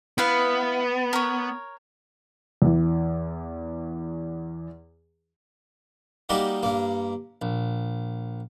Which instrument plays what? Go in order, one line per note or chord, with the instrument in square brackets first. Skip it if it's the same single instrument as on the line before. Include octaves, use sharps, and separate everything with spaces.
[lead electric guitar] B3 [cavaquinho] E4 B4 F5
[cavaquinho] A#4 C#5
[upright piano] E2 E3
[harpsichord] G3 A#3 D#4 F#4 G4
G2 A#3
A#1